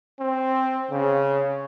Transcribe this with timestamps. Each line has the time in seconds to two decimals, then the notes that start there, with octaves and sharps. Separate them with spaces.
0.19 C4
0.91 C#3